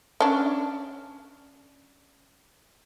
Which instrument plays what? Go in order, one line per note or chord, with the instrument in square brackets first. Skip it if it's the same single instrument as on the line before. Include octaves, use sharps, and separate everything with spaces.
[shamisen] C#4 D4